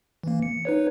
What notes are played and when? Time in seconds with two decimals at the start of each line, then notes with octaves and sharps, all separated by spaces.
0.23 E3 A#3
0.42 C#7
0.65 D#4 B4 C#5